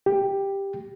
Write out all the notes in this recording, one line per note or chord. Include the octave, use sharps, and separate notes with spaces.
G4